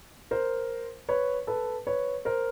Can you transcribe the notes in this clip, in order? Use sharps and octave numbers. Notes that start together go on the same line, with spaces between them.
A#4 C5
B4 C#5
A4 B4
B4 C#5
A#4 C5